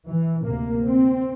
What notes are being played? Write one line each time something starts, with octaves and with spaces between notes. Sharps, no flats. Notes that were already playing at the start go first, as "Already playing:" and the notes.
E3
D2 C3 A#3
C4